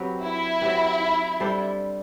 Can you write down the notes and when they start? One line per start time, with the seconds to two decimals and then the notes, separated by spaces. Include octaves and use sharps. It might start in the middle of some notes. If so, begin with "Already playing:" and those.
Already playing: F#3 C4 G4 B4
0.22 E4
0.61 F#3 C4 G4 B4
1.40 G3 D4 A4 C5